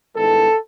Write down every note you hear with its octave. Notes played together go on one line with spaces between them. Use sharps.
G2 D#3 G#3 B3 E4 A4